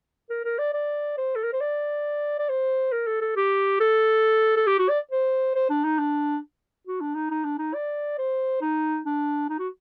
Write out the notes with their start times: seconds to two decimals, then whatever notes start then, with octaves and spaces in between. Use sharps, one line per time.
0.30 A#4
0.45 A#4
0.58 D5
0.73 D5
1.18 C5
1.36 A4
1.44 A#4
1.53 C5
1.61 D5
2.39 D5
2.49 C5
2.92 A#4
3.07 A4
3.21 A4
3.36 G4
3.80 A4
4.57 A4
4.67 G4
4.79 F#4
4.89 D5
5.11 C5
5.55 C5
5.70 D4
5.85 D#4
5.99 D4
6.87 F#4
7.01 D4
7.15 D#4
7.31 D#4
7.45 D4
7.58 D#4
7.74 D5
8.18 C5
8.61 D#4
9.06 D4
9.49 D#4
9.59 F#4